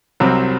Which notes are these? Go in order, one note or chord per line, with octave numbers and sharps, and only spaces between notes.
C2 C3 F#3 C4